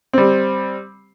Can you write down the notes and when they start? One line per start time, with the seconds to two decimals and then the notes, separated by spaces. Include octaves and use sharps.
0.13 G3 C4